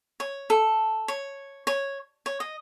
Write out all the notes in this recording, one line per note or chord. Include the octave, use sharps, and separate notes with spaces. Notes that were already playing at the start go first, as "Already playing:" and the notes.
C#5
A4
C#5
C#5
C#5
D#5